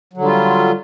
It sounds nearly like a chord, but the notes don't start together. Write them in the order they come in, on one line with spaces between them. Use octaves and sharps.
F#3 D3 G3 F4